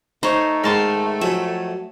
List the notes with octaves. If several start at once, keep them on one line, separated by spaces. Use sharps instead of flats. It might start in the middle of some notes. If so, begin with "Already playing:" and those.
A3 D#4 C5 C#5
G#2 D#3 A#4 A5 C6
F2 F#3 E5 G#5